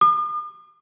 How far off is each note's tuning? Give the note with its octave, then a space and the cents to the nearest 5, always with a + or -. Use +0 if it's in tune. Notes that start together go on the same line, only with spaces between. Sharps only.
D#6 -45